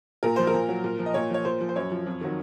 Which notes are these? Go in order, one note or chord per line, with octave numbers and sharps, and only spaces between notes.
A#2 A#4
F3 C5
A#4
A#2
F#3
A#2
F3
D#5
A#2 C#5
F3 C#5
A#2 C5
F3
C5
F#2 C#5
F3
F2
D#3 F#3